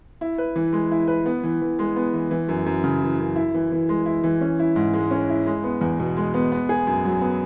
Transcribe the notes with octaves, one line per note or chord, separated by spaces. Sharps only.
E4
B4
E3
G#3
E4
B4
B3
E3
E3
G#3
B3
E3
E3
F#2
F#2
C#3
E3
F#2
E4
E3
E3
G#3
E4
E3
C#4
E4
G#2
G#3
C#4
E4
G#3
B3
E2
B2
G#3
B3
B3
G#4
F#2
F#3
B3